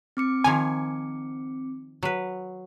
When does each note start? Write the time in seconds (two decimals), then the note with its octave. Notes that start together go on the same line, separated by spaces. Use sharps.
0.17 C4 D6 C#7
0.44 D#3 F3 G#5 A#5
2.03 F#3 B4